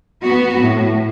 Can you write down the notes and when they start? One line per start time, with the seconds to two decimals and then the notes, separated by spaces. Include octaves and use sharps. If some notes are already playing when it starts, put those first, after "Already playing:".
0.23 B3 F#4
0.61 A2